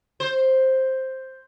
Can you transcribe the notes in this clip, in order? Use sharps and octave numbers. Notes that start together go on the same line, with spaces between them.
C5